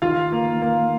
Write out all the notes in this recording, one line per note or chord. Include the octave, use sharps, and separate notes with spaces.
D#3 F4 F5
A#3
A#3